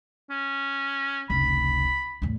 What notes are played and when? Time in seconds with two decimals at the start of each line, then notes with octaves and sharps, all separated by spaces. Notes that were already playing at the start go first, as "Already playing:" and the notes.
0.30 C#4
1.30 F1 C#2 B5
2.22 E2 A2